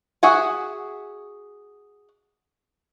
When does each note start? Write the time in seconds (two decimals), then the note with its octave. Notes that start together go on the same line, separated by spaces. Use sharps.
0.23 F#4 G#4 E5 F#5 G#5